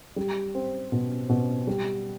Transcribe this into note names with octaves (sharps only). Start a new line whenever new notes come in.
G3
C4
B2
B2
G3